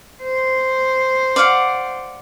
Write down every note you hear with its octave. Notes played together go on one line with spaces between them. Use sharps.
C5
D5 F5 F#5